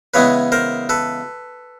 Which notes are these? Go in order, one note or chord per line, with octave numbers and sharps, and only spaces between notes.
C#3 E3 G#3 B3 B4 C#5
A#4 C5
A4 B4